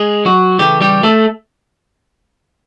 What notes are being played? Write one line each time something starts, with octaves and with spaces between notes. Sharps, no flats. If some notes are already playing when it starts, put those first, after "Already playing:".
Already playing: G#3 G#4
F#3 F#4
C#3 E3 G3 A3 G4
G3 G4
A3 A4